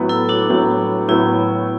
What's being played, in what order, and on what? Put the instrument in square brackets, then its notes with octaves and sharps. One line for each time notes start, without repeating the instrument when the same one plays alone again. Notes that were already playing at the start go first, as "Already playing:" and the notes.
Already playing: [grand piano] A2 F#3 B3
[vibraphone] E4 A4
D4 F#4
[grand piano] A2 F#3 B3
[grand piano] A2 F#3 B3 [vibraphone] E4